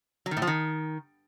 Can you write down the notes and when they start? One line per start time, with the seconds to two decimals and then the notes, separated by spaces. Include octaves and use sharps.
0.26 F#3
0.31 D#3
0.37 A2
0.42 F3
0.47 D#3